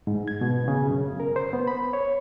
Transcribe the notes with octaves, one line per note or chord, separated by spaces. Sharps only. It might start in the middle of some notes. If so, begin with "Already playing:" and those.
G#2
G#6
B2
C#3
F#2
A#4
C5
B3
B5
C#5